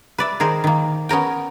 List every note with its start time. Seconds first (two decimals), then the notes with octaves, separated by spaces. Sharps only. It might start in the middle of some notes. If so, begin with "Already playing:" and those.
0.18 B4 D5 E5
0.40 D#3 G#4 A#4 C5
0.64 D#3 A#3
1.09 B3 C#4 A#4 G5